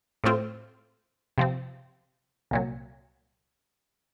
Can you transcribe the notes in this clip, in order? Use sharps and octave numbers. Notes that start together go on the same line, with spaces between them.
A2 A3 C4 F4
C3 F3 C4
C2 A#2 F#3